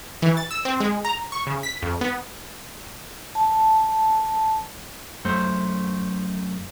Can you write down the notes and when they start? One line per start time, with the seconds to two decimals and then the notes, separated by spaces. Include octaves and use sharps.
0.22 E3
0.37 A6
0.51 E6
0.65 C4
0.80 G#3
1.05 A#5
1.32 C#6
1.47 C#3
1.63 B6
1.82 F2
2.01 B3
3.35 A5
5.25 F#2 A3 C5